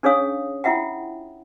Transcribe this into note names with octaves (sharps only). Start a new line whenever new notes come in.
C#4 D4 G#4 C#5 F5 D#6
E4 F4 E5 F#5 G5